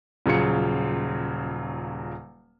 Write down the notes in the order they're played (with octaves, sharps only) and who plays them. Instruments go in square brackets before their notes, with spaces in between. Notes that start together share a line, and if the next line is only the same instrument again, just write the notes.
[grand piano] D#1 C#3 F#3 F4 C#7